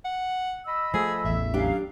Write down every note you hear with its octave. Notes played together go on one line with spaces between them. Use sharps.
F#5
D#5 B5 E6
F3 A3 G#4
A1 E2 E5
F#3 C#4 D4 G4 F5